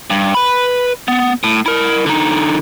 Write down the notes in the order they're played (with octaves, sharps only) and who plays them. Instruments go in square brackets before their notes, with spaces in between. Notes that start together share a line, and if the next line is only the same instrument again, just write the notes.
[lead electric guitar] G2
B4 B5
B3
A2
E4 A#4
D3 D#4